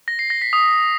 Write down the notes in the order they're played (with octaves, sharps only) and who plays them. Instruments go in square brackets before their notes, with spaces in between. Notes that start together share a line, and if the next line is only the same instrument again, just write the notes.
[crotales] A#6
C7
A#6
B6
D#6